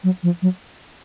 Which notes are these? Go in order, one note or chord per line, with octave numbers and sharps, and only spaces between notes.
F#3
F3
F#3